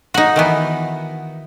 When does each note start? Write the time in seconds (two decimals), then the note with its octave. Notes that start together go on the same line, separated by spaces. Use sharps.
0.14 D#4 F#4
0.36 D#3 E3 B3